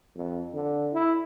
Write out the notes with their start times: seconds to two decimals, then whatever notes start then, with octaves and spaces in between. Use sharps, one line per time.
0.15 F2
0.54 D3
0.93 E4